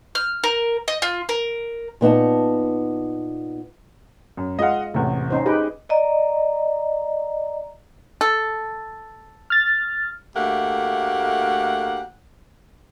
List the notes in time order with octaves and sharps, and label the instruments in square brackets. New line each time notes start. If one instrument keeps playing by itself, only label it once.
[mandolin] F6
A#4
D#5
F4
A#4
[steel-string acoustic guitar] A#2 B3 D#4 A5
[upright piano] F#2
[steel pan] G#3 F4 F5 [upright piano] D#5 F#5
[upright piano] A1 E2 C3 [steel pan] A3
[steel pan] C#4 D#4 C5
[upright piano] D#4 G#4 D#5 [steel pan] G4 B4 G5
[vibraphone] D5 D#5 A#5
[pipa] A4
[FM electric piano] F6 A6
[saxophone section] D2 A3 A#3 G4 F#5